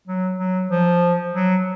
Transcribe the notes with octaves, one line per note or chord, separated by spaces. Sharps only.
F#3
F#3
F3
F#3